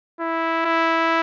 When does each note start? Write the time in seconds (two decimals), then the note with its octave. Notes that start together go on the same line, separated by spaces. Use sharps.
0.20 E4
0.66 E4